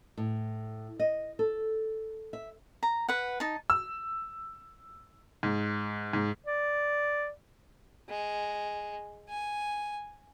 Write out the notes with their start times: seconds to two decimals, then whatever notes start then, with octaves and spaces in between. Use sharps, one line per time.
0.17 A2
0.99 D#5
1.39 A4
2.33 E5
2.83 A#5
3.09 B4 F#5
3.40 D#4 A5
3.70 E6
5.43 G#2
6.13 G#2
6.47 D5
8.09 G#3
9.29 G#5